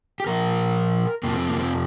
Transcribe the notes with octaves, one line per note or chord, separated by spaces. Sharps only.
G4
A#2 F3 A#4
F2 C3 F3 A#3
C4
A#3
C4